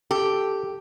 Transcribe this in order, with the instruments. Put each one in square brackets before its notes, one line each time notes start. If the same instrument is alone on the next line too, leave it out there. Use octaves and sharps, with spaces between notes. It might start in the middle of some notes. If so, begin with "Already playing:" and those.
[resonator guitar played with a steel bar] G4 [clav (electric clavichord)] A4